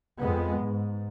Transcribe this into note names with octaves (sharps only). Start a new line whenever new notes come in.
F2 G#3 B3
G#2